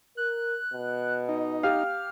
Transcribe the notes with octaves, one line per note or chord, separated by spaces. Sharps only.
A#4 F#6
B2
D#4
G4 F5 F6